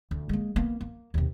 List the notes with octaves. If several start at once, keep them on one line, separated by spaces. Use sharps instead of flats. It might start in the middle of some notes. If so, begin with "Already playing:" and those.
D2
G#3 A#3
A#3 B3
A#3
D#2 C3